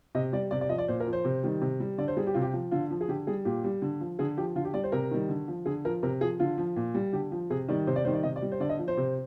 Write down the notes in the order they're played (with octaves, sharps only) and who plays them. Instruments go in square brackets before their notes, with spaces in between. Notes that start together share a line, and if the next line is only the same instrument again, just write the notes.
[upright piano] C3 D#5
G3 D5
C3 D5
D5
F3 D#5
D5
A#2 C5
A#4
F3
C5
C3
D#3 G3
C3
G3
D3 D5
C5
G3 G#4
G4
C3 F4
G4
F3
D3 F4
F3
G#4
D3 G4
G3 G#4
A#2 G4
G3
D3
F3
D3 G#4
F3 G4
D3 F4
G4
G3 D5
C5
C3 A#4
D#3 G3
D3
F3
D3 G#4
F3 A#4
C3 A#4
F3 G#4
D3 F4
F3
A#2
G3
D3 G4
F3
C3 G#4
D#3 G3 D5
C3 C5
D5
G3 C5
D#3
D5
C3 D#5
D5
G3
C5
D3 D5
D#5
F3
C5
C3